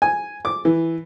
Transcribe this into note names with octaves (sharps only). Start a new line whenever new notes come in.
G#5
D6
E3